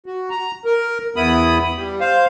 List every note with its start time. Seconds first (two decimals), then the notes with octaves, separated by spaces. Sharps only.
0.06 F#4
0.30 A#5
0.65 A#4
1.16 E2 B3 E4 B5 D#6
1.77 G3
2.00 C5 F5